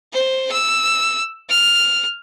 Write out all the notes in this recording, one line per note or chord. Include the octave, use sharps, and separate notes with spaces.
C5
E6
F6